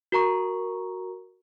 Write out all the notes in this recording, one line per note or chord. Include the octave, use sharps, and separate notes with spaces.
F#4 A#4 A#5 C#6